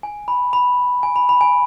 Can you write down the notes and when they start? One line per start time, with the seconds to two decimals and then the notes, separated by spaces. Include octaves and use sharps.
0.03 G#5
0.28 B5
0.53 B5
1.03 G#5
1.16 B5
1.29 B5
1.41 G#5